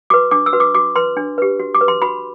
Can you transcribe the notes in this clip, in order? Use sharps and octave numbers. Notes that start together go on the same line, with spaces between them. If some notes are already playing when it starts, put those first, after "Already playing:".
F#4 B4 D6
D4 D6
E6
F#4 B4
D6
F#4 D6
B4 C6
D4
G4 B4
F#4
D6
B4
C6
F#4 B5